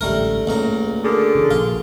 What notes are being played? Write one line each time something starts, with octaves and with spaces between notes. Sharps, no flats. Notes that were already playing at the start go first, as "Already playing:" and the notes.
D1 A1 G#2 G3 A3 A#4
C#2 A#2 A3 C#4 A#5
D3 F#4 G#4 A#4
C#3 E3
A#1 F4